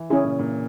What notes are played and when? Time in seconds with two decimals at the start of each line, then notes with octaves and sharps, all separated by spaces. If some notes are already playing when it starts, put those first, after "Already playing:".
Already playing: E3
0.10 C#3 C#4 E4 G#4
0.24 A#2
0.39 A#2